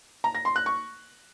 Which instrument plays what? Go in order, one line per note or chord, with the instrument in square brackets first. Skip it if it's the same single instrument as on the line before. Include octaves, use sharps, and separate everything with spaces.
[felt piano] A#5
A#6
C6
F#6
C#6